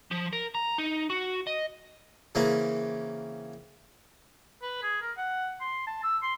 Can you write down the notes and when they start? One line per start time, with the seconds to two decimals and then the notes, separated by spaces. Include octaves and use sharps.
0.11 F3
0.33 A#4
0.55 A#5
0.78 D#4
1.10 F#4
1.47 D#5
2.35 C#3 E3 A#3 C4 C#4
4.62 B4
4.83 G#4
5.02 A#4
5.17 F#5
5.60 C6
5.87 A5
6.04 E6
6.22 C6